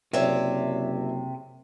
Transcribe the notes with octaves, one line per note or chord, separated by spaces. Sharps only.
F#1 C3 C#5 D5 E5